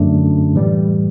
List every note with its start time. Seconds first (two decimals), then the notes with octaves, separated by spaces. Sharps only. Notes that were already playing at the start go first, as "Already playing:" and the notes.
Already playing: F#2 D3 A3 D4
0.55 A2 E3 G3